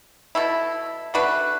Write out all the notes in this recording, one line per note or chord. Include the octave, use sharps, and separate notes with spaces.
B2 A3 E4
A3 D4 F#4 B4